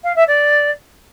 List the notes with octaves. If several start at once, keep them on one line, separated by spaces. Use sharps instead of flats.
F5
E5
D5